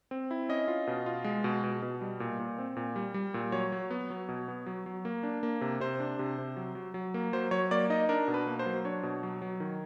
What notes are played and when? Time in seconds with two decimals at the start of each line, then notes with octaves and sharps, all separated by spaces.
0.11 C4
0.31 E4
0.49 C#4 D#5
0.68 F4
0.87 B2
1.06 F4
1.24 G#3
1.44 B2
1.64 B2
1.82 B2
2.01 G3
2.20 A#2
2.40 A#2
2.59 C4
2.76 A#2
2.96 G3
3.14 G3
3.34 A#2
3.52 F#3 C#5
3.72 F#3
3.90 B3
4.10 F#3
4.29 B2
4.48 B3
4.66 F#3
4.86 F#3
5.05 A#3
5.23 D4
5.43 A#3
5.61 C3
5.80 C3 C5
6.00 D4
6.19 C3
6.38 C3
6.57 F#3
6.75 F#3
6.94 F#3
7.14 A#3
7.33 F#3 C5
7.51 F#3 C#5
7.71 A#3 D5
7.90 D#4 D#5
8.09 D4 A#4
8.28 B2
8.34 B4
8.47 A#3
8.59 C5
8.66 F#3
8.85 D4 C#5
9.03 B2
9.23 F#3
9.42 F#3
9.60 D#3